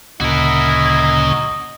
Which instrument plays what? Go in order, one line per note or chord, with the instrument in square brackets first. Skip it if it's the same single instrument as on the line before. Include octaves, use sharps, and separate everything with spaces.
[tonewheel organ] D2 A#2 C#3 [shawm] E4 [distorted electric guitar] F#4 A#4 [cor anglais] D#5